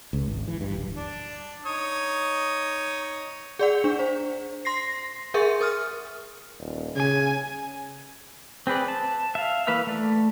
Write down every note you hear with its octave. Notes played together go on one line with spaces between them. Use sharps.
C#2
G#1
E3
G2
D1
D4
D#4 C#5 D#6
G#4 D5 F#5
D4
C5
C6 A#6 C7
G#4 A#4 E5 C6 C#6
A#4 D#6 F6
D#1
C#3 G#5
C4 G#4 B4 D5
A5
E5 F5
E3 A#3 B4 F5 E6
A3 D5